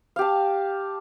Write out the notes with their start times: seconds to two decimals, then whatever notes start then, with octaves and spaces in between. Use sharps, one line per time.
0.16 F5
0.19 G4
0.21 A5